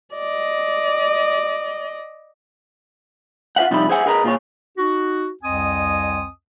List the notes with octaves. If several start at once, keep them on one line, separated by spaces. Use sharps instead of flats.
D5 D#5
F4 C5 E5 F#5
C3 F3 G3 D#4 E4
G#4 C5 E5 F#5 G#5
G#4 A#4 B4 D#5 G5 A#5
A#2 F4 G#4 C#5
D#4 F#4
C2 F2 C4 D#5 G#5 D#6